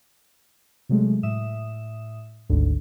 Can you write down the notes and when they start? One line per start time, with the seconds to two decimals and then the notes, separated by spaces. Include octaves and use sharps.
0.89 C3 F#3 G#3 A3
1.23 A2 E5 D#6 E7
2.49 G#1 D2 G#2 D3